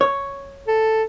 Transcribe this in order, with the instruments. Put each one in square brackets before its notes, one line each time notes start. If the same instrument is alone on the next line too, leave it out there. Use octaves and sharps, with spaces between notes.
[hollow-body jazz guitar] C#5
[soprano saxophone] A4